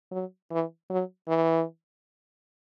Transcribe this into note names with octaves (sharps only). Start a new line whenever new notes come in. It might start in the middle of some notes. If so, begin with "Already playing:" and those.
F#3
E3
F#3
E3